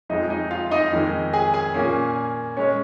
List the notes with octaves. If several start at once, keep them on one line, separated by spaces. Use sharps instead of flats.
F2 F3 G#3 D#4 D#5
D#4 D#5
F4 F5
D#4 D#5
F2 D#3 G#3
G#4 G#5
G#4 G#5
A#2 A#3 C#4
G#3 C#4 C#5